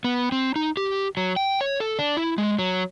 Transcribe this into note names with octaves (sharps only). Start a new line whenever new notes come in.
B3
C4
D#4
G4
F#3
G5
C#5
A4
D4
E4
G#3
F#3